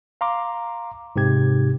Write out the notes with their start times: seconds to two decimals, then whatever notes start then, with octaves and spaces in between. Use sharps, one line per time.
0.21 F5 A#5 C6 D6
1.16 G#2 C3 G4 G#6